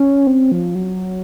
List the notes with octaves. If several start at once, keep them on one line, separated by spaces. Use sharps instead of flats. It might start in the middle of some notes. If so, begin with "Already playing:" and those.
Already playing: C#4
C4
F3
F#3